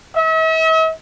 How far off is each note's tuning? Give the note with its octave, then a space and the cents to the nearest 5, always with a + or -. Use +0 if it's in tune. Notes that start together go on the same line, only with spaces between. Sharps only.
E5 -45